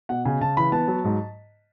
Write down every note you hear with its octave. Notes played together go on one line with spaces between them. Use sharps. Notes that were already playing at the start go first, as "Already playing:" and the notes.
B2 F#5
C#3 G#5
C#3 A5
E3 B5
B3 A5
F#3
G#2